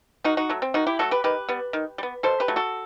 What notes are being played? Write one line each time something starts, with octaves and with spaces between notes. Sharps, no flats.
D#3 D#4 F#4
D#4 F#4
F#3 A3
C4
D#3 D#4 F#4
E4 G4
F#3 A3 F#4 A4
G4 B4
D#3 G4 B4
G3 B3
D#3
G3
B3
B2 A4 C5
G4 B4
F#3 A3
F#4 A4